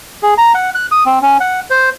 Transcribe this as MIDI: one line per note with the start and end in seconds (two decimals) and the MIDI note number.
0.23 0.34 68
0.38 0.52 82
0.55 0.70 78
0.75 0.87 90
0.92 1.04 87
1.06 1.19 60
1.22 1.38 61
1.40 1.60 78
1.70 1.90 72